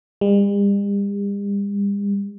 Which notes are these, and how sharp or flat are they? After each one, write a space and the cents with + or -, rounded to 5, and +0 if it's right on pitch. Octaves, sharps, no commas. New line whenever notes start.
G3 +45